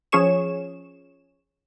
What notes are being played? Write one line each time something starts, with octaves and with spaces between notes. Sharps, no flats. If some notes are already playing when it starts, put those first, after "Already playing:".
F3 C#4 G#4 C#5 E7